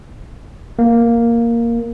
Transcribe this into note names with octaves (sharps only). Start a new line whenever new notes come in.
A#3